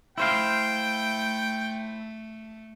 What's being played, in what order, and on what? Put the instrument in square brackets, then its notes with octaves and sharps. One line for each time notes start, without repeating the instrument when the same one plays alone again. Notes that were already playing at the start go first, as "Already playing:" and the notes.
[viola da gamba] A3 [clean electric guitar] E4 C5 F5 [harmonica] G5